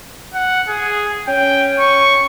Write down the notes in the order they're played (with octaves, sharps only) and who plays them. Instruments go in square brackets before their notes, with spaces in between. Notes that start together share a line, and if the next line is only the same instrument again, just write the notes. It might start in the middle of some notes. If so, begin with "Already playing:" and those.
[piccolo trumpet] F#5
G#4
[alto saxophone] C#4 [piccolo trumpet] G5
[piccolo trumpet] C#6